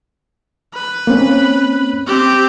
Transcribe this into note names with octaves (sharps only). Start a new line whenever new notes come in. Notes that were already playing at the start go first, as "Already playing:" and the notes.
B4
A#3 C4 C#4
C4 G4